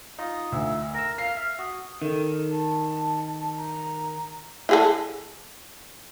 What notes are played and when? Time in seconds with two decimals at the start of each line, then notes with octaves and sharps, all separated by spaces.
0.19 D#4 F4 D#5 D#6
0.52 D2 E6
0.94 A#4 E6 A#6
1.18 F5 C7
1.36 E5 F6
1.59 F#4 D#6
2.02 D#3 A4
2.51 A5
3.57 A#5
4.69 E4 G#4 A4